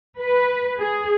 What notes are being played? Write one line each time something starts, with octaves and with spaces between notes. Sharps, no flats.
B4
G#4